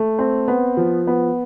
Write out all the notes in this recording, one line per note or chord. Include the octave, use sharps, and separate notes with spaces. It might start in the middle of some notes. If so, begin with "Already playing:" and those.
Already playing: A3
C4
B3
F3
B3